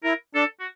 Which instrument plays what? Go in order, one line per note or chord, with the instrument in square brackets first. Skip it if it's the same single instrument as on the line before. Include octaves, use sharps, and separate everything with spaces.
[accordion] E4 [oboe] A#4
[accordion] D4 [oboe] A4
[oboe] F#4